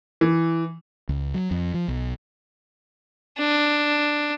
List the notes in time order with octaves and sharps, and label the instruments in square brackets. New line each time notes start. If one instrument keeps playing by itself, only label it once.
[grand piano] E3
[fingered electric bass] C#2
F#3
F2
F3
B1
[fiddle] D4